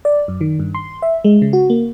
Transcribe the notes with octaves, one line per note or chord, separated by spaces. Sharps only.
D5
F#2
D#3
G2
C6
E5
G#3
C#3
F#4
A#3